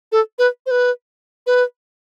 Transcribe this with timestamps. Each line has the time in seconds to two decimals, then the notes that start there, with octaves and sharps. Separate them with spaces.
0.12 A4
0.39 B4
0.66 C5
0.71 B4
1.47 B4